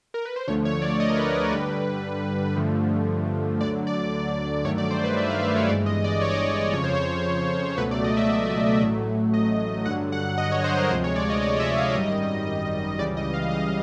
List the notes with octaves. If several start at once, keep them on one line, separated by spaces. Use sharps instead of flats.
A#4
B4
C5
D2 D3 F3 A3 C#5
C#5
D5
D#5
A#4
B4
A#4
G2 D3 G3 B4
G2 D3 F3 A3
D2 D3 F#3 D5
D5
G2 D#3 F#3 A3 C#5
D5
C5
B4
E5
F5
E5
C#5
G1 G2 E3 G#3 D5
D#5
D5
C#5
D5
D#5
D#5
F2 C#3 F3 C#5
C5
C#5
C#2 B2 F#3 A3 B4
D5
D#5
E5
A1 A2 F#3 A3
D#5
G2 D3 F#3 F#5
F#5
D#5
C#5
C5
A#4
D2 C3 F3 G#3 C5
C#5
D5
D#5
D5
D#5
E5
F5
G#1 F#2 D#3 G3 D#5
C#2 C#3 E3 G3 D5
D#5
F5
D#5